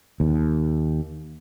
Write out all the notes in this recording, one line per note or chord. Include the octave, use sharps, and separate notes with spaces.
D#2